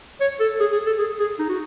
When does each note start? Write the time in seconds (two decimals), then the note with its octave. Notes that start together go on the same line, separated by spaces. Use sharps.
0.21 C#5
0.40 A4
0.60 G#4
0.73 G#4
0.87 A4
0.99 G#4
1.20 G#4
1.39 D#4
1.49 F#4